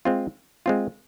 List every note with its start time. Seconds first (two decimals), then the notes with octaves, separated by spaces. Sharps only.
0.05 G#3 C4 F4
0.66 G#3 C4 F4